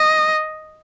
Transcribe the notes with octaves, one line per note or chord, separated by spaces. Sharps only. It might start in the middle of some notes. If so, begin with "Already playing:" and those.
Already playing: D#5